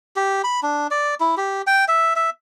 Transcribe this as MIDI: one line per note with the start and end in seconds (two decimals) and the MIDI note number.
0.16 0.42 67
0.44 0.60 83
0.63 0.87 62
0.91 1.15 74
1.20 1.35 64
1.37 1.62 67
1.67 1.85 79
1.88 2.13 76
2.16 2.30 76